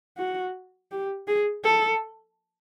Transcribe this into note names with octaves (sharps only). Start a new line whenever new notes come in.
F#4
G4
G#4
A4